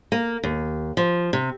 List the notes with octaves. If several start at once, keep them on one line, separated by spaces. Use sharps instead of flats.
A#3
D#2
F3
C3